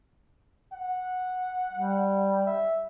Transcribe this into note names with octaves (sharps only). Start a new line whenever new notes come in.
F#5
G3
E5